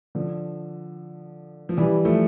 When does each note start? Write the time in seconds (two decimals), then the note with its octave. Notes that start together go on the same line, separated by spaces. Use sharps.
0.15 D3 F3
1.69 F3
1.77 E3 G3
2.05 F3 A3